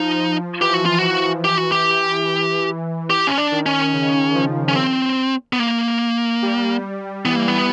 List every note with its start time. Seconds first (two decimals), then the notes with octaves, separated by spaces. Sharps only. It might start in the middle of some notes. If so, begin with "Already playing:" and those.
Already playing: F3 D#4
0.61 E3 G4
0.74 F#4
0.86 F4
0.99 F#4
1.44 G4
1.57 F#4
1.72 G4
3.10 G4
3.27 C#4
3.38 D4
3.52 D#3
3.66 C#4
3.93 C#3
4.35 F3
4.69 C#4
4.76 C4
5.53 B3
5.59 A#3
6.42 G3
7.25 E3 B3
7.36 A#3
7.48 B3